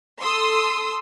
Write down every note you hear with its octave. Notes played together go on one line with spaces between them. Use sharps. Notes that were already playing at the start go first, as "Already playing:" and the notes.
A4 C6 D#6 E6